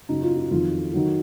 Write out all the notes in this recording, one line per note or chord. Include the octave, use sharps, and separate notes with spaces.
F#2 C#3 F#3 D#4
F4
F4
F2 D#3 F#3 F4
D#3 F#3